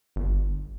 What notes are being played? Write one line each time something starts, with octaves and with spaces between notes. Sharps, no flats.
G1